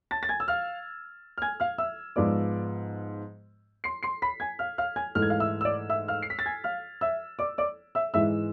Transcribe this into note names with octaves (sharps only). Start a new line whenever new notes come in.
A5 A6
A6
G#5 G#6
E6
F5 F6
F6
G#5 G#6
F5 F6
E5 E6
G#2 F3 B3 D5 D6
C6 C7
C6 C7
B5 B6
G#5 G#6
F5 F6
F5 F6
G#5 G#6
G#2 E3 A3 F6
G#6
F5 F6
E5 E6
E6
D5 D6
E5 E6
F5 F6
C7
B6
A6
G#5 G#6
F5 F6
E5 E6
D5 D6
D5 D6
E5 E6
G#2 E3 G#3 E5 E6